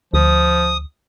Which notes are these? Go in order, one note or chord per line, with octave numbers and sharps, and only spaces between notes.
D2 F3 D#6